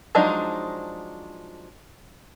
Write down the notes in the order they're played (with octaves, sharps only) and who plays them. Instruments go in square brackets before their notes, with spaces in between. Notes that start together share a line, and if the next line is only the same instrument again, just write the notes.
[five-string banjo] F3 F#3 G#3 D4 D#4